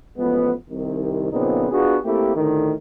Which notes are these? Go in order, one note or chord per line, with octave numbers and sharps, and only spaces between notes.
A1 F3 G#3 B3
C2 C3 D#3
A#2 C#3 F3 B3 C4 D#4
B3 D4 F4 F#4 G#4
A3 A#3 C4 E4 G4
D2 A2 D3 D#3